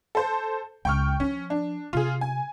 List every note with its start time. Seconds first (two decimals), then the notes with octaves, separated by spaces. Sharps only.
0.15 A4 C5
0.85 C#2 G5 C#6 F6
1.20 F3 C#4
1.50 D4
1.93 C3 F4 G#4
2.21 G#5